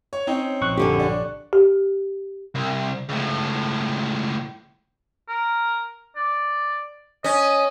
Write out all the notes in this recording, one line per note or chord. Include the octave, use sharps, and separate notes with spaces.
C#5
C4 C#4 D#4
A#1 C#6 F#6
F#2 D3 G4
D4
G4
C2
C#2 A2
A#4
D5
C#4 D#5